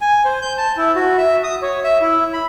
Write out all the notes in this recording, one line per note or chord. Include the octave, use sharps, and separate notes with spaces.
G#5
C5
G6
A5
E4
F#4
E5
D#6
C#5
E5
E4
B5